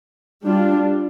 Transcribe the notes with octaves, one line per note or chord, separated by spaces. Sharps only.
G3 D4 F4